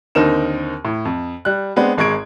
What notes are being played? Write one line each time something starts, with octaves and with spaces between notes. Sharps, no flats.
D#2 D3 C4 D#4 A#4 E7
A2
F2
G3 F#6
G#3 B3 C4 D4
G#1 G#3 C#6 G#6 D7